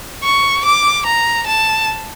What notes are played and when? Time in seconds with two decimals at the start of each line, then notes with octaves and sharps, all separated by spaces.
0.23 C#6
0.64 D6
1.06 A#5
1.47 A5